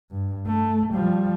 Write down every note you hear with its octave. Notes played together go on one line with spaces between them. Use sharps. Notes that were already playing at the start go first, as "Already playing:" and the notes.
G2
A3
F3 G3